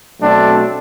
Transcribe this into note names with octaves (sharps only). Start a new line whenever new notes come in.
B2 F#3 A3 C4 D4